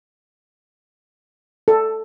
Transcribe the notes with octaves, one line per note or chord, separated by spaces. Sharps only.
A4